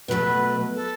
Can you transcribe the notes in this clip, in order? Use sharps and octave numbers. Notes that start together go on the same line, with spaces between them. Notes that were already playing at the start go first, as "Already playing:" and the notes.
B2 F#3 A3 B4
A4